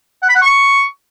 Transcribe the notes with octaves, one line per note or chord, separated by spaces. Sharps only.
F#5
B5
F#5
C#6